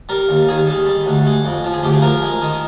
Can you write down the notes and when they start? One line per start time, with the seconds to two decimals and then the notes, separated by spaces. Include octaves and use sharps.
0.09 G3 A#4
0.29 D#2
0.48 D#3 G#4
0.67 G3
0.86 G3
1.06 D2
1.25 G#3
1.45 F2
1.64 F3
1.74 G#4
1.83 D2 G4
1.94 G#4
2.02 F3 A#4
2.22 G#3
2.42 D#3